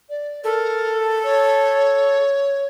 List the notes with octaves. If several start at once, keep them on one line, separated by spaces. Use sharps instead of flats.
D5
A4 A#4
C#5